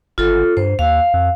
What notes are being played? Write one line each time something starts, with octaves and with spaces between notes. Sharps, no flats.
G1 F4 A4
G2 C5
D#2 F5
F2